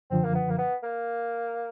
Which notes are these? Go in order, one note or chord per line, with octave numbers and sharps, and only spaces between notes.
F#2 D3 F3 C4
A#3
B3
A#3
B3
A#3